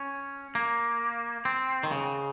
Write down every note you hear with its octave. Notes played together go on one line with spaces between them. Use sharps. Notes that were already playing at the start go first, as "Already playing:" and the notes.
Already playing: C#4
A#3
C4
D#3
C#3